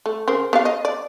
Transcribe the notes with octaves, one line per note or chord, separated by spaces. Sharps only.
A3
C#3 A#4 C5
B3 G4 F5
D#5
D5